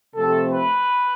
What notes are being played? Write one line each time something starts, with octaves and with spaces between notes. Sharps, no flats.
C3 F3 A3 C4 A4
B4